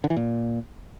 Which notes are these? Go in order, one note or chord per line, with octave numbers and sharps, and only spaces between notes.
D3
E3
A#2